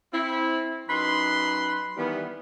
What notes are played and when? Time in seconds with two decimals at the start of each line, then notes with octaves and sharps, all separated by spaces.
0.13 C4 E4
0.89 F#2 D#4 B4 B5 C6
1.97 D#3 E3 G3 B3